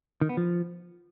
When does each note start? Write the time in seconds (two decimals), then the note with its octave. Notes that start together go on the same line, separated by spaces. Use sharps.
0.21 D#3
0.29 B3
0.37 F3